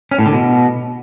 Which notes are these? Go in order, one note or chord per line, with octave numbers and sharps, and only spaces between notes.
C#4
A2
D3
B2